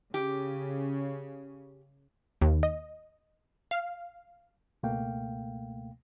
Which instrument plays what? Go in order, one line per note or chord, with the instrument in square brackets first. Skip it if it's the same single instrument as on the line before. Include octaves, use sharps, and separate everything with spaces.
[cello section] C#3 [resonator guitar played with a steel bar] G4
[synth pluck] D#2
D#5
F5
[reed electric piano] C#2 B2 A3 A#3 F5 G5